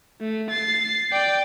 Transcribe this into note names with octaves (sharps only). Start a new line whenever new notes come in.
A3
A6 C7
D5 G5